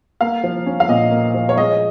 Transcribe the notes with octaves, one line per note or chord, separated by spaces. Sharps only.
A#3 F5
F3
C#4
F5
A#2 D#5
A#3
F3
C#5
G#3 D#5